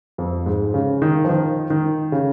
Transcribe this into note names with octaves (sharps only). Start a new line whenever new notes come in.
F2
G#2
C#3
D#3
F3
D#3
D#3
C#3